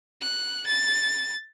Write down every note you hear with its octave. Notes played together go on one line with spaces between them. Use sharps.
F#6
A6